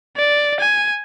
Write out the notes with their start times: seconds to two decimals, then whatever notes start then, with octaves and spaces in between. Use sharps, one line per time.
0.17 D5
0.60 G#5